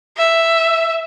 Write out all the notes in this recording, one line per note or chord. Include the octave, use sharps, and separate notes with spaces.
E5